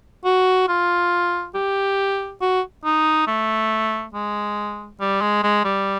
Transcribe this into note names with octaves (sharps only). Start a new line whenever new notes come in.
F#4
F4
G4
F#4
D#4
A3
G#3
G3
G#3
G#3
G3